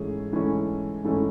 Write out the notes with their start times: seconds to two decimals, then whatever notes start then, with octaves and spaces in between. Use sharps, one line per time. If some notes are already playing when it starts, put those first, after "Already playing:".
Already playing: G#2 E3 A3 C#4 G#4
0.33 G#2 E3 A3 C#4
1.04 G#2 E3 A3 C#4